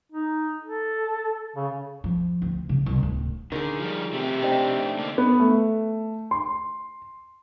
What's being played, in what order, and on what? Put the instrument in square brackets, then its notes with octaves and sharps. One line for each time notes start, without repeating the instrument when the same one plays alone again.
[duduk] D#4
A4
C#3
[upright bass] F3
D2
C#3
C2
D1
[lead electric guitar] D3 [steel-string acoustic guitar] D#3 G#4
[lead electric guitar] F3 G3
[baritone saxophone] C3 [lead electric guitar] A3 G4
[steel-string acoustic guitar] C4 D4 D#4
[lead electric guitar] D3 A#3
[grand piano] B3
A3
C6